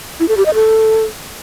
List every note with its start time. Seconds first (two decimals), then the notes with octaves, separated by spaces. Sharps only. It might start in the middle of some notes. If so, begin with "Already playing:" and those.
0.20 E4
0.28 A4
0.37 G4
0.46 D#5
0.54 A4